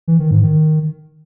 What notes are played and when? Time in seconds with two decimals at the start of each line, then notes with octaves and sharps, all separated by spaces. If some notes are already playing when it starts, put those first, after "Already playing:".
0.08 E3
0.19 D#3
0.31 G#2
0.43 D#3